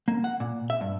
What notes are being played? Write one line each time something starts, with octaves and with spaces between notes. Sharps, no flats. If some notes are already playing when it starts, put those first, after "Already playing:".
A#3
F#5
A#2
E5
G2